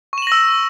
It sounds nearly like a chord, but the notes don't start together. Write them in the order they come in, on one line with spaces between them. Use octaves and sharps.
C#6 E7 F#7 A#6 E6